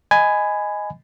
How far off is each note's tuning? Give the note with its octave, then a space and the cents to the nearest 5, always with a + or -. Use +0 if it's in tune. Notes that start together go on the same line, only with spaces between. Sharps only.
D#5 +0 G#5 +0 B5 +15